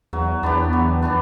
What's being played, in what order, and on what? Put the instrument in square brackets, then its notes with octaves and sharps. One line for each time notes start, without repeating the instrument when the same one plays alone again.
[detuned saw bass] E2 [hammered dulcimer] F#3
[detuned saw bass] E2 [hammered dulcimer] B3 D4 G4
[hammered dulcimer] F#3
B3 D4 G4